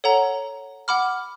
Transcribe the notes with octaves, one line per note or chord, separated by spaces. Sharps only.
A4 C#5 F#5 A#5
F#5 B5 D6 F6